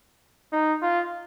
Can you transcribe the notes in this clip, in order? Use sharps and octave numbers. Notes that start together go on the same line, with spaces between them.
D#4
F4